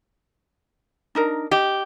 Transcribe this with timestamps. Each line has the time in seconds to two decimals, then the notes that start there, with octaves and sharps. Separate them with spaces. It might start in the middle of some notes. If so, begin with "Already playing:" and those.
1.15 D4 D#4 A#4
1.51 G4 D#5